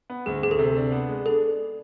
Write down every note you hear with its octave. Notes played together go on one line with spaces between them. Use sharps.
B3
D2 G#4
D2 G#4
A4
C3
D4
B3
G#3
D4 A4